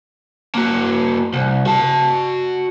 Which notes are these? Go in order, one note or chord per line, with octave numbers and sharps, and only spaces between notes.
A#3 F#4
C2
F#4 A5